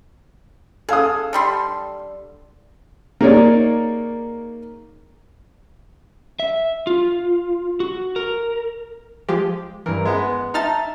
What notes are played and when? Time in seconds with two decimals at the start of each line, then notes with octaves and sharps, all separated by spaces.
0.89 G#4 A4 F5 D#6
1.33 D3 G3 C6
3.21 A#3 D#4 G#4 A#4 C#5 D5
6.40 E5
6.87 F4
7.80 F#4
8.16 A#4
9.29 F3 G#3 G4
9.86 G2 E3 A#4
10.05 G#3 B3
10.54 D#4 E5 A5 A#5 F6 A6